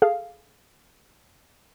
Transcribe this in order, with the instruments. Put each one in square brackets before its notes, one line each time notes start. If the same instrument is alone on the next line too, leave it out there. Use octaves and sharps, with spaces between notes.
[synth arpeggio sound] G#4 A4 F5